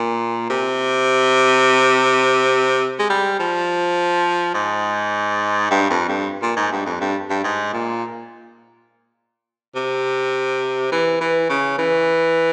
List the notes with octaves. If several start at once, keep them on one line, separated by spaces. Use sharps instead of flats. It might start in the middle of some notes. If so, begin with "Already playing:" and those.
Already playing: A#2
C3
G#3
G3
F3
G#2
G2
F2
G2
A#2
G#2
G2
F2
G2
G2
G#2
A#2
C3
E3
E3
C#3
E3